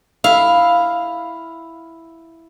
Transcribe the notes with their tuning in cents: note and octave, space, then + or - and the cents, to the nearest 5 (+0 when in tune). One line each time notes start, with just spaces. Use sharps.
E4 +0 F5 +0